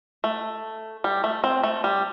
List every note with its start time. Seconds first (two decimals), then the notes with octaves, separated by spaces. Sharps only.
0.24 A3
1.04 G3
1.24 A3
1.44 C4
1.63 A3
1.84 G3